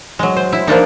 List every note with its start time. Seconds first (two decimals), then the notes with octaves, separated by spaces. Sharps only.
0.19 F#3 G#3
0.36 C5
0.53 E4
0.67 F3 A#3 D4 D#4